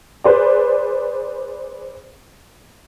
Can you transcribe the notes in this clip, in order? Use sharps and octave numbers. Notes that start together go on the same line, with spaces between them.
G#4 B4 C5 D5